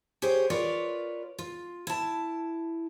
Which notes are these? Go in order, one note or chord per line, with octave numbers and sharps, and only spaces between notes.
G4 G#4 C5 C#5
F4 A#4 B4 C#5 D5 F5
F4
E4 A5